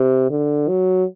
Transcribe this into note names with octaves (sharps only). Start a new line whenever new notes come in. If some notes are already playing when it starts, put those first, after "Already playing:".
Already playing: C3
D3
F#3